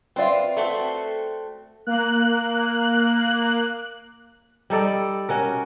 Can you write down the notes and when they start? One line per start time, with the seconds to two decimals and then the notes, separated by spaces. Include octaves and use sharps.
0.16 C4 F4 B4 D5 E5
0.57 A3 C4 F#4
1.87 A#3 F#6
4.70 G3 D#4 A4 D5
5.29 C#4 F#4 A#4